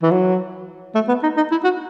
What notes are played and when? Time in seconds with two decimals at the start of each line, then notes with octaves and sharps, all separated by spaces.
0.02 E3
0.11 F#3
0.95 A3
1.08 B3
1.23 D#4
1.37 D#4
1.51 E4
1.64 F#4